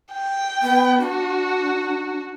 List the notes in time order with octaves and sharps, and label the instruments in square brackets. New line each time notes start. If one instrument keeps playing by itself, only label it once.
[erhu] G5
[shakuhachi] B3
[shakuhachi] D4 [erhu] F#4